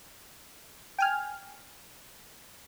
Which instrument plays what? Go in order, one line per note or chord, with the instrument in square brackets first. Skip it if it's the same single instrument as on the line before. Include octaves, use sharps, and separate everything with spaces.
[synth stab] G5 G#5 F6